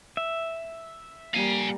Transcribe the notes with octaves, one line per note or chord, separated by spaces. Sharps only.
E5
G3 A#3 F5 G#5